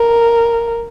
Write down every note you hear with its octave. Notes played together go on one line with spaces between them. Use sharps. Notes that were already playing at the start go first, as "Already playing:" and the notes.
Already playing: A#4